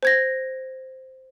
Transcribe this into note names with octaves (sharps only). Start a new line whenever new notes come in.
C5 G#6 A#6